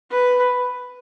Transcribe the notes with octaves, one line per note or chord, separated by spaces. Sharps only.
B4